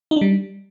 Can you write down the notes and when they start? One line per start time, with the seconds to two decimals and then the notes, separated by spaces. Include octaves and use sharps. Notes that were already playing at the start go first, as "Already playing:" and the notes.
0.11 D#4
0.16 D4
0.21 G3